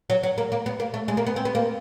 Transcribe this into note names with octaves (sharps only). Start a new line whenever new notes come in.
F#3
F#3
A#3
A#3
B3
A#3
A3
G#3
A#3
B3
C4
B3
A#3